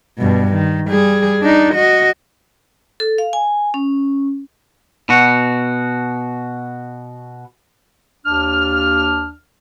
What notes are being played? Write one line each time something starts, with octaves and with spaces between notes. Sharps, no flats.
G2 B2
D#3
G3 G#4
D4 D#4
F#4 D#5
A4
F5
G#5
C#4
B2 F#4
D#2 D4 F6